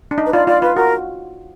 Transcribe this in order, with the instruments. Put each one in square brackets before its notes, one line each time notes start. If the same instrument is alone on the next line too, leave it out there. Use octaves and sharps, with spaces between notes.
[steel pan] D4
D#4
[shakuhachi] B4
[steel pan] F4 [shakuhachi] D5
[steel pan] F4 [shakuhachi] D5
[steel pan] F4 [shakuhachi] B4
[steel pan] F#4 [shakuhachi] A#4